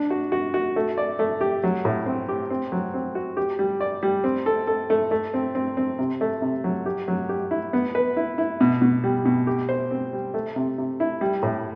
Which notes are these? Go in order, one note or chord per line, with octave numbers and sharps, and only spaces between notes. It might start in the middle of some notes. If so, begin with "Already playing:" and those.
Already playing: D4
F#4
F#4
F#4
A3
D5
A3
G4
F#3
A2
C4
G4
C4
F#3
C4
F#4
G4
G3
D5
G3
C4
A4
A4
A3
A3
C4
C4
C4
C3
A3
C3
F#3
G4
F#3
G4
E4
B3
B4
E4
E4
B2
B2
G3
B2
G4
C5
C4
G3
A3
C3
C3
E4
G3
A2